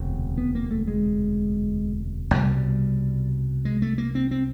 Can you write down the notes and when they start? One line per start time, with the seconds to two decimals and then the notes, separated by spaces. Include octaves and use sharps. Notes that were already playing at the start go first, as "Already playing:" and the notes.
Already playing: E1 D2 C3
0.38 B3
0.55 A#3
0.71 A3
0.87 G#3
2.34 C2 B2 G3
3.65 G#3
3.82 A3
3.98 A#3
4.15 C4
4.31 C4